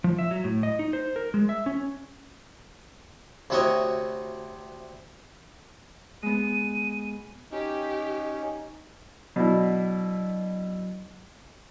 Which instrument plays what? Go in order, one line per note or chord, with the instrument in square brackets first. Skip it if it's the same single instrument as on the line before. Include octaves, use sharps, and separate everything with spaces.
[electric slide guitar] F3
E5
F#3
A2
D#5
D#4
C5
A#4
G#3
E5
C#4
[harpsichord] D2 C3 E4 F#4 C#5 D#5
[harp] G#3 B3 [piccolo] D#7
[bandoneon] C#4 [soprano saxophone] D#4 [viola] G4
[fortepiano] B2 D4 E4 [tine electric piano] F#3